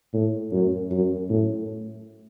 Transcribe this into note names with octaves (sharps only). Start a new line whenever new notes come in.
A2
F#2
F#2
A2